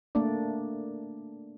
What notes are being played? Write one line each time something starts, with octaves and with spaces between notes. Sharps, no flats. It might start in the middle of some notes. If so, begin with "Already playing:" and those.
A3 A#3 D4 D5